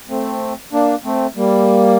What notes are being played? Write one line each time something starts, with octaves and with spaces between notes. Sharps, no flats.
A3 C4
A#3 D4
A3 C4
G3 A#3